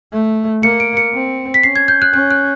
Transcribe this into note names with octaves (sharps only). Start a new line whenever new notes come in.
A3
A#3 C#7
D7
C#7
C4
B6
C#4 C7
G#6
G6
F#6
C#4 F#6
F#6